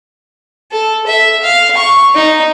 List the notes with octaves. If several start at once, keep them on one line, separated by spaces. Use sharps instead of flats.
A4
E5
F5
C#6
D#4